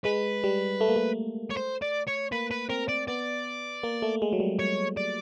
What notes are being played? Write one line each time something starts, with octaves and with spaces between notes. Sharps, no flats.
G#3 B4
G3
A3
A#3
A3
C#5
C5
D5
C#5
A#3 B4
B4
C4 A#4
D5
B3 D5
A#3
A3
G#3
F#3
G3
C#5
D5